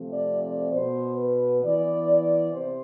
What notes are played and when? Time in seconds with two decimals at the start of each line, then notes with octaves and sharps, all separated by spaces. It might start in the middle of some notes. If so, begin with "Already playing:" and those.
Already playing: C3 F3 A3 C4
0.12 D5
0.42 D5
0.71 B2 B3 C5
1.17 B4
1.63 E3 B3 D5
2.08 D5
2.52 C3 C5